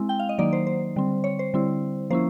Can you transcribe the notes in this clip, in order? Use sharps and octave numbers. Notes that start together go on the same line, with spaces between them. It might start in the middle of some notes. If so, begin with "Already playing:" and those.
Already playing: G#3 C4 E4
G5
F5
D#5
D#3 F#3 A#3 D#4 D5
C5
C5
D3 G3 C4
C#5
C5
D3 G3 C4 E4
F3 A#3 C#4 E4 C5